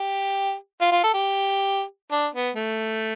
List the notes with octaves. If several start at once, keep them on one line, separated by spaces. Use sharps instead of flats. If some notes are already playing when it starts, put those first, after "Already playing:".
Already playing: G4
F4
F4
A4
G4
D4
B3
A3